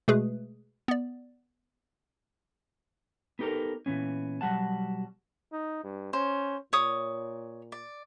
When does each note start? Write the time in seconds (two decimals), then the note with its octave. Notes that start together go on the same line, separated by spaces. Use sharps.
0.08 B2 G#3 A3 G#4 B4
0.88 B3 D5
3.39 B3 D#4 G4 A4 A#4
3.86 A#2 E3 B3 C#4
4.41 B2 F#3 G3 F#5 A5
5.53 D#4
5.84 G2
6.13 C#4 C5
6.73 A#2 C#5 D#6
7.72 D5